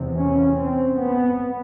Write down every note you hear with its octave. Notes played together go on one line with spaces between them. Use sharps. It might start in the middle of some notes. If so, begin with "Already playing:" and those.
Already playing: E2 C3
C#4
C4
B3